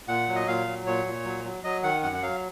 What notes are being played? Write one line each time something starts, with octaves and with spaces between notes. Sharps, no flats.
A#2 F#5
F#3
D#5
A#2 F5
F#3
A#2 C#5
A#2
F#3
F#3
F#3 D#5
D#3 F#5
F#2 F#5
F#5
F#3 F5